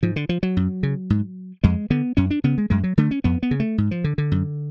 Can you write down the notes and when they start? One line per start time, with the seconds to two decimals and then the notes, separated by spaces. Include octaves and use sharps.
0.03 G#2 F3
0.16 D3
0.29 F3
0.43 F#3
0.57 F#2
0.83 C#3
1.10 G#2
1.64 F2 G#3
1.90 D3 B3
2.17 F#2 C#4
2.31 D4
2.44 C#3 B3
2.58 G#3
2.70 F#2 G#3
2.84 F#3
2.98 D3 A3
3.11 C#4
3.24 F2 B3
3.43 B3
3.51 C#3
3.60 A3
3.78 G#2
3.91 F3
4.04 D3
4.18 D3
4.32 F#2